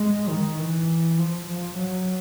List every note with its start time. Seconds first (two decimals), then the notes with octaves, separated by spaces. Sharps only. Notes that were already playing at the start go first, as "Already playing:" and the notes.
Already playing: G#3
0.29 D#3
0.59 E3
1.18 F3
1.47 F3
1.77 F#3